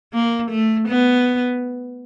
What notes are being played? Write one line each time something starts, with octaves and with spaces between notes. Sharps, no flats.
A#3
A3
B3